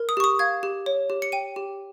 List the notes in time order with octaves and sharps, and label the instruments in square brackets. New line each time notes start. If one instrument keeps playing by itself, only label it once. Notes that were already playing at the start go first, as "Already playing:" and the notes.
Already playing: [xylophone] A#4
D#6
G4 C#6
D#6
F5 G#6
G4
C#5
G4
C#7
G5 D#7
G4